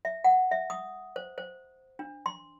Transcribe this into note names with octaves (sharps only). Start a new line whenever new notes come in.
E5
F#5
E5
D#6
C5
C5
D4
C6